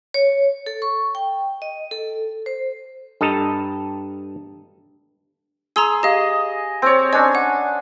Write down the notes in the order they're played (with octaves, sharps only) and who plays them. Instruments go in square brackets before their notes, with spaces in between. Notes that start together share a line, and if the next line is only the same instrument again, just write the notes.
[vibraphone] C#5
A4
C#6
G5
D#5
A4
C5
[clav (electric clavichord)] G2 A4 D#5 A5 A#5
[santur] G#4 [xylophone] A#5 C6 E6
[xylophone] G4 F5 [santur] D#5
[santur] C4 C#5
[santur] C#4 D4 G#5 [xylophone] D#5
[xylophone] F#5